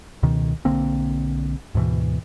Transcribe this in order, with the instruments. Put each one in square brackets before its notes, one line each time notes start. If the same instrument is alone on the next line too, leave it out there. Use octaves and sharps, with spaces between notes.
[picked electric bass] C#2 B2 D#3
B1 D3 A#3 C4
D2 G#2 B2 E3